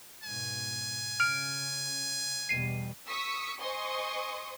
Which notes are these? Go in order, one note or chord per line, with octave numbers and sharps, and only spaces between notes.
G#2 B2 G#5
C#3 F6 D7
E2 B2 G3 C7 D#7
C#6 D#6 E6 B6 C#7
C5 D#5 G#5 C6 C#6 D#6